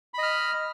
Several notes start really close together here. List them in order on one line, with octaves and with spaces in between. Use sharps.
B5 D#5 F6